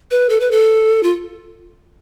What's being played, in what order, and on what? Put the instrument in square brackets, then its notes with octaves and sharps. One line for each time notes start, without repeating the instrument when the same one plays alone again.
[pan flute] B4
A4
B4
A4
F4